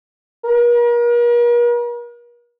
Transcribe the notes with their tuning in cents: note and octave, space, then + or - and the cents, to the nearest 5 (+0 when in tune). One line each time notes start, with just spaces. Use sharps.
A#4 +40